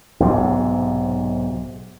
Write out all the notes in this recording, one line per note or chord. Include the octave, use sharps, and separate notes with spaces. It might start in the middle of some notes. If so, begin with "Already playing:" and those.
B1 G#2 C3